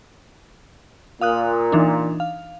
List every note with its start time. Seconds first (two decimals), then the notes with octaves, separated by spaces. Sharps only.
1.21 A#2 F5 D#6 F#6
1.72 E3 D4 D#4
2.20 F5